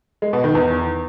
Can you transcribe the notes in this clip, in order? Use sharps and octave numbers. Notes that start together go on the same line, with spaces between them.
G#3
B2
D#3
E2